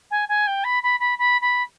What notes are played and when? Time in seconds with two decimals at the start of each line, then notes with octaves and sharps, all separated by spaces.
0.10 G#5
0.28 G#5
0.47 G5
0.64 B5
0.83 B5
0.99 B5
1.18 B5
1.41 B5